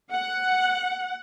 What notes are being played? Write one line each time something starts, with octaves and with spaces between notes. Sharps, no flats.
F#5